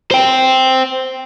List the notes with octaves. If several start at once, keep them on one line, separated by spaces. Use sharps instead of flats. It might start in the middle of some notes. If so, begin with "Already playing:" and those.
C5 G5